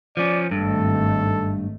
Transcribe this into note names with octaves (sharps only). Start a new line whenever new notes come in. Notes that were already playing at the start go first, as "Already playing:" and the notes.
F3 C#4 D5
G#1 G2 D#3 A3 A4